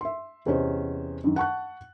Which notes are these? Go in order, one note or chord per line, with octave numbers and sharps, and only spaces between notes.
E5 C6
E2 C3 C#4 C5 D#5
F#2 D#3
F#5 A5 C#6 F#6